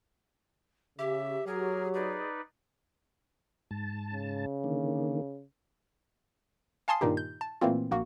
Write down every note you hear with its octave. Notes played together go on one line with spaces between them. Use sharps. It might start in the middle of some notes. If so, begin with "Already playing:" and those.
C#3 G4 E5
F#3 G#4 A#4
D#4 G#4 B4 D5
G#2 A5
C#3
D3 D#3 A#3
F5 G#5 A5 C6 D#6 C7
G2 A#2 D#3 D#4 G4
G6
A5
A#2 E3 A3 A#3 C4 F4
A#1 A#3 F#4